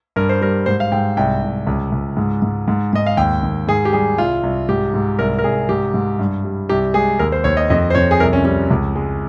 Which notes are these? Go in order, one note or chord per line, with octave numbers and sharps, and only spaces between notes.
G2 A#4
C5
G3 A#4
G#2 C5
F5
G#2 G5
C2 G5
C2
C#2
C#2
G#2
G#2
G#2
G#2 D#5
F5
D#2 G5
D#2
G#2 G#4
G4
G3 G#4
C2 F4
C2
G#2 G4
G#2
C2 A#4
A#4
C2 G#4
G#2 G4
G#2
G2
G3
C2 G4
G#3 G#4
D#2 A#4
C5
D#2 C#5
D#5
F2 D#5
C5
F2 C#5
G#4
C2 A#4
C#4
G3 C#4
C#2
G#3